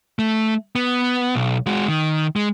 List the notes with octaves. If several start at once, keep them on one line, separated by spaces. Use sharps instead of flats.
A3
B3
B1
G#3 F#4
D#3
G#3